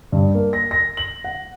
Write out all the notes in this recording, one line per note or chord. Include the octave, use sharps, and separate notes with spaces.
G2
A#3
A#6
A#6
F#7
F#5